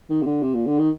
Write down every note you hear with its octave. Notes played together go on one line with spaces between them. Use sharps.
D#3
C3
D3
C3
A#2
D3
D#3